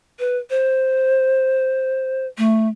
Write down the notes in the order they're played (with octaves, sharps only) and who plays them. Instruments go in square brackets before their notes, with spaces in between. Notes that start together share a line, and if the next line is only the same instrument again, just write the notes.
[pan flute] B4
C5
A3